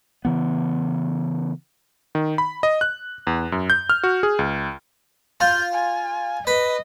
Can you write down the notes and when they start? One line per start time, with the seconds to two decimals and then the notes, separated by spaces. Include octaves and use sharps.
0.25 C#3 E3 B3
2.15 D#3
2.38 B5
2.63 D#5
2.81 F#6
3.27 E2
3.52 F#2
3.70 G6
3.90 F6
4.04 F#4
4.23 G#4
4.39 C#2
5.41 F4 G6
5.74 G#5
6.47 B4 D#5